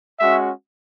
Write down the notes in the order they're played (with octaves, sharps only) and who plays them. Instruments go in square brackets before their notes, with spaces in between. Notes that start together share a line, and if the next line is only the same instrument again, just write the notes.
[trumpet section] G#3 C#4 F#4 E5